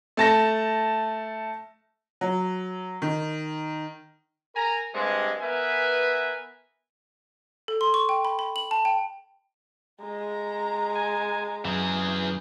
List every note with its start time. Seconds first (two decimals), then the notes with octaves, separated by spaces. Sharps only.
0.17 A3 A5 A#6
2.21 F#3
3.02 D#3
4.55 A#4 G#5 A#5
4.94 G2 C3 G#3
5.42 B3 A#4 B4 E5 G#5
7.68 A4
7.81 C6
7.94 C#6
8.09 G5
8.25 B5
8.39 B5
8.56 F#7
8.71 A5
8.85 G5
10.01 G#3 A#5
10.96 G#5
11.65 F#2 E3 G#4